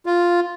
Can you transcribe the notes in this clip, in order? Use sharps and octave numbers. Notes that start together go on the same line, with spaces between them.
F4